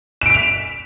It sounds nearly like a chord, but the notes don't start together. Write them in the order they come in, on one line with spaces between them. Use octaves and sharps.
E7 D7 B6 F7